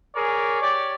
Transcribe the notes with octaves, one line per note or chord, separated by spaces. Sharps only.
G#4 A#4 C#5 D5
G4 C#5 D5